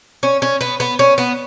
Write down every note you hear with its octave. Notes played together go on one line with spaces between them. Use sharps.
C#4
C#4
B3
B3
C#4
B3